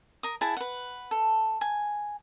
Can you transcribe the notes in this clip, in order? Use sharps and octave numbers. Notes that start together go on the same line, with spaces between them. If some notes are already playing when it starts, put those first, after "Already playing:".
A#4 D#6
E4 G#4 F#5 A5
B4 F#5
A4
G#5